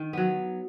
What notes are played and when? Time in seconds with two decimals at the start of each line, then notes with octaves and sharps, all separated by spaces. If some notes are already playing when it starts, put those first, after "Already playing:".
Already playing: D#3
0.13 F#3 B3